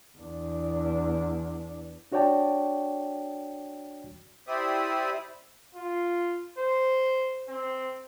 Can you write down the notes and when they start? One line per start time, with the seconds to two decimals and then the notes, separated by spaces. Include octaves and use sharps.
0.18 E2 D4
2.12 D4 F#4 C#5 D5 G5 A5
4.47 E4 G4 C5 D5 E5 D#6
5.75 F4
6.58 C5
7.48 C4